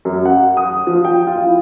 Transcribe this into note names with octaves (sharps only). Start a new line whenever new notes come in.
F#2
F#5
D#6
F3
G5
F4
E4